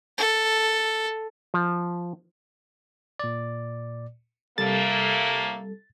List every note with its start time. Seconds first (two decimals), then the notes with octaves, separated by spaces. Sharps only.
0.18 A4
1.54 F3
3.19 A#2 D5
4.58 A2 C3 G3 A3 A#3 A4 A6